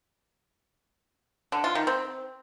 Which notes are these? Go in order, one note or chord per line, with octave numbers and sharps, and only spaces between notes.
D3
F4
D#3
C4